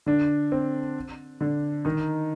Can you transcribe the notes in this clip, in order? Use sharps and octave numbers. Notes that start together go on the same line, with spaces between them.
D3 D4
C4
D3 D4
D#3 D#4